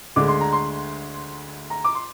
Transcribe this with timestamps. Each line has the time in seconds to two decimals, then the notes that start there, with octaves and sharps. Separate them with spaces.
0.16 D2 D3 G#3 D6
0.28 C6
0.41 A#5
0.53 C6
1.70 A#5
1.84 D6
1.95 C6